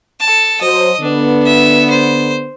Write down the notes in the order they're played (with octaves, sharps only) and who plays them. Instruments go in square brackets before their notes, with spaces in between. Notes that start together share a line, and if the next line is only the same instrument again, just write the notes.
[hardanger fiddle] A4 A5
[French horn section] F#3 C5 [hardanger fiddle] D#5
[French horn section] D3 B3 [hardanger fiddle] D4
[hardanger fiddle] E5
C5